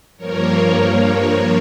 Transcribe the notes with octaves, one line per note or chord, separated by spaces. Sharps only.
G2 F3 A#3 A#4 C#5